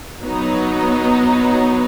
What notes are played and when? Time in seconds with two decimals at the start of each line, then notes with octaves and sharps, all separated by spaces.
0.22 F#3 B3 D#4